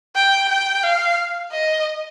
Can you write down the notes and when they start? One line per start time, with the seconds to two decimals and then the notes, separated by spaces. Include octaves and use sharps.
0.15 G5
0.49 G5
0.83 F5
1.52 D#5